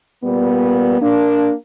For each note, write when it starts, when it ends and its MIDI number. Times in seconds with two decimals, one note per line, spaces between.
0.24 0.98 46
0.24 0.98 55
0.24 0.98 59
1.01 1.53 58
1.01 1.53 62